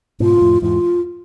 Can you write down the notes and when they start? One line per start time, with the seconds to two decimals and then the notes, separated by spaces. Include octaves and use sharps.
0.20 G#2 B2 F4
0.37 B2
0.41 F2 A2
0.62 E2 G#2 F4